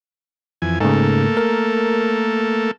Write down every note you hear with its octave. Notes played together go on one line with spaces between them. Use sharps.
F2 E3 G#5
G#2 C#3 A3 A#3 A4
A#4